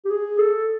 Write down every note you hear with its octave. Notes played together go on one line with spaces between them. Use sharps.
G4
G#4
A4